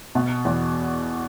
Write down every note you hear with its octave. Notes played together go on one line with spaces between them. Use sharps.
B2
E2